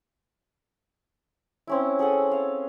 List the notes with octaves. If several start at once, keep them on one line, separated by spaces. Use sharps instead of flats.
C4 C#4 E4
G#4 A4 F#5 G#5
F5